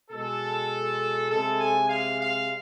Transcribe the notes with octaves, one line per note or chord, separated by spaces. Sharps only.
B2 G#3 A4
C3 G#3 A4
G#5
F5
F5